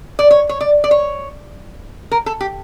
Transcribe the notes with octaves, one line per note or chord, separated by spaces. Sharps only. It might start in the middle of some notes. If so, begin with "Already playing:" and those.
D5
C#5
C#5
D5
D5
C#5
A#4
A4
G4